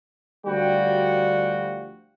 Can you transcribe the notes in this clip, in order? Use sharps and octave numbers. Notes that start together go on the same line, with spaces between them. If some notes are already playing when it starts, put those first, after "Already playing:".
D2 F3 G3 F#4 G5